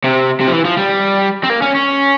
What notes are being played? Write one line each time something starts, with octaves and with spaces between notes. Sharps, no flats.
C3
C3
F3
E3
F3
G3
C4
A#3
C#4
C#4